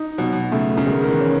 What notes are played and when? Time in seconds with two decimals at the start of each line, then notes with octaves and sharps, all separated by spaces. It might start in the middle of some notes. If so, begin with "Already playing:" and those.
Already playing: D#4
0.18 B2 F#3
0.32 B2
0.52 C#3 A3
0.77 C#3
0.86 D#3 G#3
1.03 D#3
1.09 E3
1.21 C#4